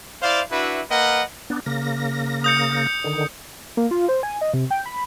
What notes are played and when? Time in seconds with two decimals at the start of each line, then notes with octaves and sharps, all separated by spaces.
0.21 E4 C5 D5 F5
0.51 D4 E4 F#4 B4 E5
0.90 A#3 A#4 B4 D#5 F#5
1.50 B3 D4
1.66 C#3 A#3 A#6
2.44 D#6 G6 C#7
3.04 D3 D#3
3.77 A#3
3.91 F4
4.08 C5
4.23 G#5
4.41 D#5
4.54 C3
4.71 G5
4.86 B5